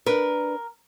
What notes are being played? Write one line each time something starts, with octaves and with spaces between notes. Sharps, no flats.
D4 A#4 B4